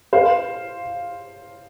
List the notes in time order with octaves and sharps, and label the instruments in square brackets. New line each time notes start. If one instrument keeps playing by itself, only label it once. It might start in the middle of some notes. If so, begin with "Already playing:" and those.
[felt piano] C5 F5